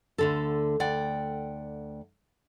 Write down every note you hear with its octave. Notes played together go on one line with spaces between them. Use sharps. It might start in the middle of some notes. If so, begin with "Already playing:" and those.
D2 D3 A4
D2 D5 F#5 G5